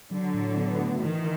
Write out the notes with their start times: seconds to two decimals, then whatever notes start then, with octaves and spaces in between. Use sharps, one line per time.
0.11 D3 F#3
0.34 A2
0.56 B3
0.79 A2
1.02 D#3 E3